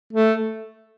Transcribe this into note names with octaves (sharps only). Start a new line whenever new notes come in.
A3